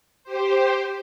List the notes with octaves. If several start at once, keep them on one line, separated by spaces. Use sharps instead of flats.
G4 C5